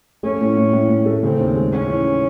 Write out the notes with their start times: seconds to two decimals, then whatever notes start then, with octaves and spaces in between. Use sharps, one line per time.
0.23 A3 C#4
0.41 A2
0.57 A2
0.73 A2
0.89 A2
1.06 A3
1.23 C#3 C4
1.40 D#2
1.55 G#3
1.72 G#3 C#4
1.88 E3